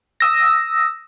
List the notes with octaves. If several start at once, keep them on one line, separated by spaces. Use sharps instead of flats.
D#6 E6 A#6